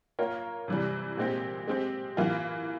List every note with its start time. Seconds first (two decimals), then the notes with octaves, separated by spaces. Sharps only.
0.19 A#3 F4 A#4 C#5
0.68 C3 E3 G3
1.17 A#2 G#3 C4 G4
1.68 G#3 C4 G4
2.17 E3 A#3 F4